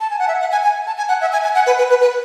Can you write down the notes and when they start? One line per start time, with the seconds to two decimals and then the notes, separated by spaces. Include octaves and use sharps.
0.01 A5
0.10 G#5
0.19 F#5
0.28 E5
0.40 F#5
0.52 G#5
0.63 G#5
0.87 A5
0.97 G#5
1.08 F#5
1.21 E5
1.32 G#5
1.44 G#5
1.55 F#5
1.67 B4
1.78 B4
1.90 B4
2.01 B4